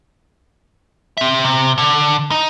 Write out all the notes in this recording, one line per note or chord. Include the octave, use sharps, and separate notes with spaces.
C4 E5
C3
D3
D#4